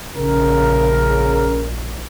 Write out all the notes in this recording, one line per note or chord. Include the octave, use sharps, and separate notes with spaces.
A#1 C#3 A#4